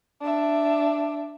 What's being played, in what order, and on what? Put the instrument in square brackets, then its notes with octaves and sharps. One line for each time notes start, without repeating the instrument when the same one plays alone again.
[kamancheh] D4 E5